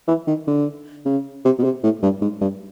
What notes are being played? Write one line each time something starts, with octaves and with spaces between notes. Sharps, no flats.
E3
D#3
D3
C#3
C3
B2
C3
A2
G2
G#2
G2